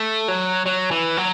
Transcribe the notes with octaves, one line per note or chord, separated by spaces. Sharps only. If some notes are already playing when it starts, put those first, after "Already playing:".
Already playing: A3
F#3
F#3
E3
F#3